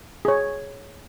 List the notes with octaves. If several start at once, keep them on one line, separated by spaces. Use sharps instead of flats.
G#4 C#5